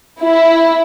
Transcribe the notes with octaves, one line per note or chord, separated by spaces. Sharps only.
E4